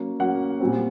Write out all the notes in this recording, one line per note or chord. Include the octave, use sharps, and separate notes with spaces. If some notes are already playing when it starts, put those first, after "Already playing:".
Already playing: F#3 A#3 C#4
F#3 A#3 C#4 F#5
A#2 G3 C4